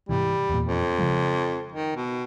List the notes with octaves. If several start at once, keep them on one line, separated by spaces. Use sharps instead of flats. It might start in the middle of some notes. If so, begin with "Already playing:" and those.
G#2 C3 E3 G3
E2 A#2
F2
C#3 F3 G#3
D#3
B2